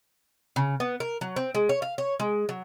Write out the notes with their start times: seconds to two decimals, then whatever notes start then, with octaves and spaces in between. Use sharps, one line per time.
0.56 C#3
0.80 B3
1.00 A#4
1.21 F#3
1.36 C4
1.55 G#3
1.69 C#5
1.82 F5
1.98 C#5
2.20 G#3
2.49 F#3